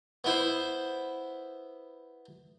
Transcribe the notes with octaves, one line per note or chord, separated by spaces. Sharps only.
B3 E4 C5